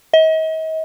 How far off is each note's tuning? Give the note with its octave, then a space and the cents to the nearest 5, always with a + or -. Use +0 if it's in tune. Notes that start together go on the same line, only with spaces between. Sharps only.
D#5 +40